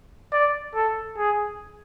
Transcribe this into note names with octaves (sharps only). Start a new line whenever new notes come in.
D5
A4
G#4